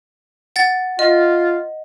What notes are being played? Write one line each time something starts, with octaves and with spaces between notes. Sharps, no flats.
F#5 A6
F4 D#5